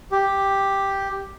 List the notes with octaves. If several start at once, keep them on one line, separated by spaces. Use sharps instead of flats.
G4